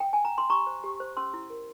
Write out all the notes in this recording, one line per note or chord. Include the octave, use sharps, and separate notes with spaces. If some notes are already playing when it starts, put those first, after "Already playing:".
G5
G#5
A#5
C6
G4 A#5 C#6
C5
G4
C5
C#4 C6 E6
E4
A#4